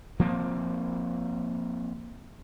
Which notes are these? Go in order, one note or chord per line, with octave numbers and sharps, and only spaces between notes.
F3 A#3 C4